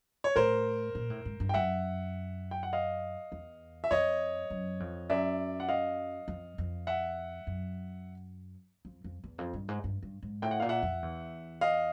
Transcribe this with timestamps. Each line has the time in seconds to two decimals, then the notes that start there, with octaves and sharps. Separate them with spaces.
0.24 C#5
0.36 A2 A#4 C5
0.95 A#2
1.10 A2
1.25 G#2
1.40 G2
1.49 G5
1.54 F#2 E5 F#5
2.51 G5
2.63 F#5
2.73 D#5 F5
3.32 E2
3.84 E5
3.91 F2 C#5 D#5
4.50 F#2
4.80 F2
5.10 F#2 D5 E5
5.60 F#5
5.69 D#5 F5
6.28 F2
6.58 F2
6.87 E5 F#5
7.47 F#2
8.85 F2
9.04 F2
9.24 E2
9.38 F2
9.54 G2
9.68 G#2
9.84 G2
10.03 G2
10.23 G#2
10.42 A2 G5
10.51 F#5
10.60 A#2 F5
10.69 E5 F#5
10.82 F2
11.02 E2
11.61 D#5 F5